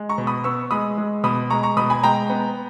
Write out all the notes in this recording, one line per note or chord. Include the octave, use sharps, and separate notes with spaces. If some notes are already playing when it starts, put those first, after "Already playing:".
Already playing: G#3
A#5 C#6
B2
B5 D#6
B3 C#6 E6
G#3 B5 D#6
G#3
B2 B5 D#6
G#3 A#5 C#6
A#5 C#6
B2 B5 D#6
G#5 B5
G#3 G5 A#5
B3